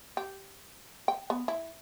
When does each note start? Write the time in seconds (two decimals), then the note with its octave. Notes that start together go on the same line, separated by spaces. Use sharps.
0.17 G4
1.08 G5
1.30 B3
1.48 E4